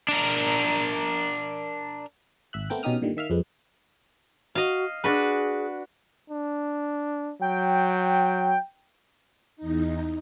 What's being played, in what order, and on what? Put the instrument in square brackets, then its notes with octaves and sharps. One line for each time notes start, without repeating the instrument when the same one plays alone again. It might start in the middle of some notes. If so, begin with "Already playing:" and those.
[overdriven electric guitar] D4 A#4
[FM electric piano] G#1 E5 F#6
A3 B3 C4 A#4 G5
B2 C#4 D#4 G4 D#6 F6
G2 A#2 D3 D#3 G3
D#3 E5 F5 F6
F2 G#3 B4
[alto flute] F#4 [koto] D#5 F5
[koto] D4 F#4 B4 [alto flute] G#4
[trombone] D4
[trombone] F#3 [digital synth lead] G5
[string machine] E2 D#4